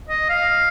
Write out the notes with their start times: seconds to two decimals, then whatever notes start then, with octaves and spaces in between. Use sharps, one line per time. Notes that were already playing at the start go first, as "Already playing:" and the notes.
0.09 D#5
0.29 F5